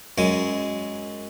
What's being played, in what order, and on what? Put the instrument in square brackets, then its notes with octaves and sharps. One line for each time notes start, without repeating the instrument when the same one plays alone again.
[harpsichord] F#2 G#3